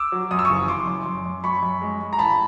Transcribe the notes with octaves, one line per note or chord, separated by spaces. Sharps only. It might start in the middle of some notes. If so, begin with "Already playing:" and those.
Already playing: D6 E6
F#3
F#2 D#6
E6
F#1 C#6 D#6
F#1 C6 D6
F#2
F#2
F#2
F#2 B5 C#6
F#2
G#3
G#3
A#5
A1 A5 B5